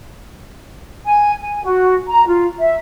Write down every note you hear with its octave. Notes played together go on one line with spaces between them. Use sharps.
G#5
G#5
F#4
A#5
F4
E5